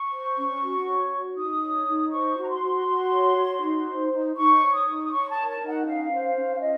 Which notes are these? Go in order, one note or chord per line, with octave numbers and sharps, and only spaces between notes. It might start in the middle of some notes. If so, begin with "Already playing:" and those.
Already playing: C#6
C5
C#4
F#4
C#5
F#4
D#4 D#6
C#5
D#4
C5 C#6
F#4
A#5
C6
F#4
F#4
C#5
F#4
D#4
C5
D#4
D#4 C#6
C#5
D#6
D#4
D#6
C#5 C#6
A5
A#4
A5
D#4
F#5
C#4 F5
C5
C#4
F5
F4 D#5